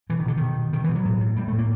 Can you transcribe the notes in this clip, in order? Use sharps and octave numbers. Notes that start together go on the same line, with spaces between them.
B2 E3
D#3
B2 D3
B2 D#3
B2
B2 D#3
E3
B2
F#3
A2
A2
A2 G3
A3
A2
A#3